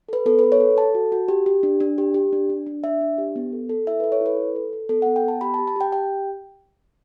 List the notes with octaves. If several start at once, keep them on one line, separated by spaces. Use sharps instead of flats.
A4 B4
B3 A4
B4
A4
C#5
A4
A4 A5
F#4
F#4
G4
G4
D4
D4
G4
G4
D4
D4
D4
D4 E5
D4
G4
B3
A4
A4
E4 E5
B4
A4
C#5
E4
B4
A4
A4
A4
B3 A4
F#5
B3
G5
B3 A5
G4 B5
A5
G4
A5
G4 G5
G4 G5